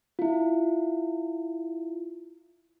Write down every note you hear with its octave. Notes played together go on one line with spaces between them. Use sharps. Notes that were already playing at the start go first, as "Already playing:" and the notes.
E4 F4